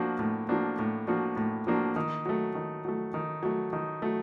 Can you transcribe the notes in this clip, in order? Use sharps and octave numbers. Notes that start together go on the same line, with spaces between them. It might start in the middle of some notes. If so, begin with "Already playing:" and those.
Already playing: F3 A#3 D4 F#4
A2
F3 A#3 D4 F#4
A2
F3 A#3 D4 F#4
A2
F3 A#3 D4 F#4
D#3
F#3 A3
D#3
F#3 A3
D#3
F#3 A3
D#3
F#3 A3